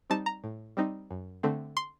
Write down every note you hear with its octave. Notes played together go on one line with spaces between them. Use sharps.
G3 C4 D#4 A5
A#5
A2
G3 C4 D#4
F#2
D3 A3 C4
C6